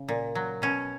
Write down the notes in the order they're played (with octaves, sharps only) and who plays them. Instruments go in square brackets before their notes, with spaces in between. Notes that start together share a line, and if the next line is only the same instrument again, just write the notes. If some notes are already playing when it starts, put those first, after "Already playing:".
Already playing: [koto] C#3
A#2
F#3
B2 C#4